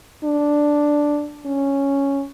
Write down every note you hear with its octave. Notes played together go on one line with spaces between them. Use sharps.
D4
C#4